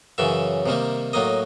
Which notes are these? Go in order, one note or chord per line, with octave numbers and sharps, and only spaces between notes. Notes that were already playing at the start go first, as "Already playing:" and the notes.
F#2 C#3 E3 E5
C3 D#3 G3 A#3
A2 F#3 A#3 D#5